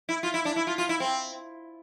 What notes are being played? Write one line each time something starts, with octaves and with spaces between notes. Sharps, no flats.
E4
F4
E4
D4
E4
F4
F4
E4
C4